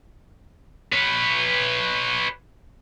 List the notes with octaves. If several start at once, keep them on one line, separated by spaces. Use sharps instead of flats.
B4 C#5